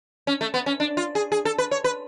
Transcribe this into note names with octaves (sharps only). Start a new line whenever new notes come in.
C#4
A3
B3
C#4
D4
F4
G#4
G#4
A4
B4
C#5
B4